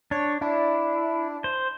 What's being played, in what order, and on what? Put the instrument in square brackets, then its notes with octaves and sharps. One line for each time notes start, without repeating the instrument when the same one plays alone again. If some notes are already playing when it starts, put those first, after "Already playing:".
[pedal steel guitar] D4 [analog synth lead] C#5
[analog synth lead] D4 [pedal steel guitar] E4
[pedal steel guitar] C5